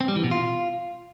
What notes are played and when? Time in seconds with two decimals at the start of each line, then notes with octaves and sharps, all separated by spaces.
0.01 C4
0.08 G3
0.16 E3
0.24 B2
0.31 F4